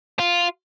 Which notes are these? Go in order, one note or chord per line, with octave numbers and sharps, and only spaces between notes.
F4